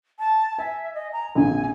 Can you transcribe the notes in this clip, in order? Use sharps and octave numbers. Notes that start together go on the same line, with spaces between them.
A5
E5 G#5
D#5
A#5
A#1 F2 D3 G#5